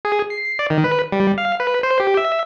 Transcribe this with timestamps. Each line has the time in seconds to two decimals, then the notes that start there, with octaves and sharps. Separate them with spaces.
0.05 G#4
0.30 C7
0.59 D5
0.70 D#3
0.84 B4
1.12 G3
1.38 F5
1.60 B4
1.83 C5
2.00 G4
2.17 E5